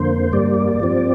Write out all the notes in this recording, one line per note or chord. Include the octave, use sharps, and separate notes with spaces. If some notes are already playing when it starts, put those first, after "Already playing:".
Already playing: F2 D3 A#3 C5
G2 G3 A#3 D5
G2 F3 C4